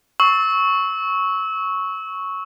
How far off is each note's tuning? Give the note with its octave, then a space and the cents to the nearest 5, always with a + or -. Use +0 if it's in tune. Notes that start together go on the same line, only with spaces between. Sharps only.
C#6 +0 E6 -25